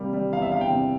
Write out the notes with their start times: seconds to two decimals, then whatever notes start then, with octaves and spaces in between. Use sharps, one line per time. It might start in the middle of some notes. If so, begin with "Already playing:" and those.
Already playing: C3 G3 A#3
0.13 G3
0.33 E2 F5
0.42 E5
0.51 E2 F5
0.61 G5
0.72 C3